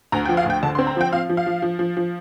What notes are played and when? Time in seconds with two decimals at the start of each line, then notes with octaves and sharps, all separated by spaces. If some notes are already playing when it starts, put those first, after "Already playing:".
0.12 D2 A#5
0.25 G5
0.29 F3
0.37 F5
0.46 D2 G5
0.63 D3 A5
0.75 C6
0.79 C4
0.87 A#5
0.96 F3 G5
1.13 F3 F5
1.29 F3
1.37 F5
1.46 F3
1.62 F3
1.79 F3
1.97 F3